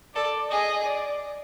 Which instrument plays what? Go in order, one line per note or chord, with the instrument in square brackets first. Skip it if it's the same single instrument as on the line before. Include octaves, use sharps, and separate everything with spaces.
[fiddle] A4 [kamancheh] D5
[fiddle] G#4 [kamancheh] D#5
[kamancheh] D5